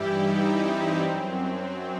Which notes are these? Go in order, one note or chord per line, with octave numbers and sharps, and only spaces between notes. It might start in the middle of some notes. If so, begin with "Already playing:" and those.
Already playing: G2 E3 G3 E4 G4
D#4
C4
F#2 F#3 C4
C4